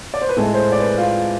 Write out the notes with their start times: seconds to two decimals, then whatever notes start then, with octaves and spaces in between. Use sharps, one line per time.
0.14 D5
0.22 C5
0.29 B4
0.36 A2 G#3 A4
0.54 C5
0.72 D5
0.80 B4
0.98 F4